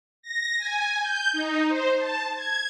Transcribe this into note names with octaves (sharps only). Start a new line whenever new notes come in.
A#6
G#5
G6
D#4
C5
A5
G#6